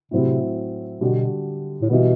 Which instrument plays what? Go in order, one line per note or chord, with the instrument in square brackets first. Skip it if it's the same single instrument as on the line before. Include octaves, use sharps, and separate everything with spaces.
[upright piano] A2 F#3 C4 E4 [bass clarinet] C3
[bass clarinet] B2 [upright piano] D3 G3 D4 F#4
[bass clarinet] A2
[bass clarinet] B2 [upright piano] E3 G3 B3